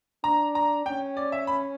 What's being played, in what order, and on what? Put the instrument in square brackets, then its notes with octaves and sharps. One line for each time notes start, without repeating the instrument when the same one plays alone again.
[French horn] D4 [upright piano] A#5
[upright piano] A#5
[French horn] C#4 [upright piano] G5
[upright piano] D5
E5
B5